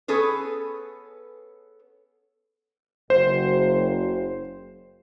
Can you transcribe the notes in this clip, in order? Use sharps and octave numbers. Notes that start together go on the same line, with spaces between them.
B3 C#4 G#4 A4 B4
F#1 C5